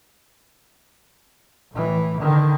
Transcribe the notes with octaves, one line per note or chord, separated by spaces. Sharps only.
A2 E3
D3 D#3